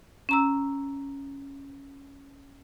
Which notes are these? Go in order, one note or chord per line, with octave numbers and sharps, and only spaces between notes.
C#4 A#5 E6